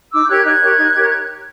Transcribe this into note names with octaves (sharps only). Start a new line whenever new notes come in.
D#4 D6 E6
G6
G4 A#4 C#5 F#6 G#6
D#4 F#6 G#6
G4 A#4 C#5
D#4
G4 A#4 C#5